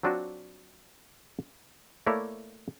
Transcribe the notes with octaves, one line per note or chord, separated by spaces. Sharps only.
F#3 C4 D4 F4 F#4
A3 A#3 E4 C#5 D5